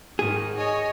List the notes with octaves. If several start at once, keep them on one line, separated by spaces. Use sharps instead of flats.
G#2 D#3 G#4
C#5 D#5 G#5